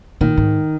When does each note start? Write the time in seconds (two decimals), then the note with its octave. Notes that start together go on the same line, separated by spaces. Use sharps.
0.21 A#2 D#3
0.37 G#2